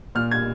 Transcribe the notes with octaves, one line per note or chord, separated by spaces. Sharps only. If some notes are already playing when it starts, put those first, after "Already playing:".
A#2 F6
G#6